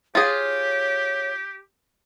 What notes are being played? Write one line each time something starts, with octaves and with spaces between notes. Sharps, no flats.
F4 G4 G#4 C#5